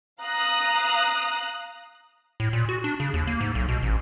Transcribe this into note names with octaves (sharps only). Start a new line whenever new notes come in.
F5 A#5 D#6 F#6
A2
A#2
F#4
D4
C#3
D#2
A#3
G#2
B1
B2
A1